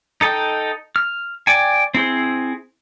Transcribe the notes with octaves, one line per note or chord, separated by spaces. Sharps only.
D#4 A4 D#5 G5
F6
D5 G5 G#5
C4 E4 G#4 C5